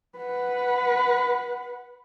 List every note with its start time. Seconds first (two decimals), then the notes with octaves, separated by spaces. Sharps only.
0.18 B4 F#5